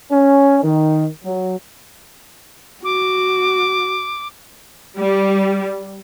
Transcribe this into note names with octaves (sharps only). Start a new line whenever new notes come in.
C#4
D#3
F#3
F#4 D6
G3